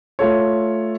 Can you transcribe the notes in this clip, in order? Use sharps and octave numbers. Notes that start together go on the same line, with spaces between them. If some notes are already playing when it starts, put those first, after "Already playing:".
A3 F4 A4 C#5